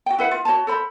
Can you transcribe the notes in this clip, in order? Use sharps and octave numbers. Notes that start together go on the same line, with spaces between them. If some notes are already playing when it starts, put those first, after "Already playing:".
F#4 G5
E4 B4 F#5
F4
F#4 C5 C#5 A5
A4 C5 B5